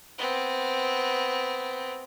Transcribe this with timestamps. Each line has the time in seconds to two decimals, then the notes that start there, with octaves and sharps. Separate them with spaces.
0.18 B3 C4